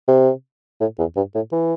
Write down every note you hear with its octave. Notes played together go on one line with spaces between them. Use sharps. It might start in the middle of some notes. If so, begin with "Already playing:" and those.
C3
A2
E2
G2
A2
E3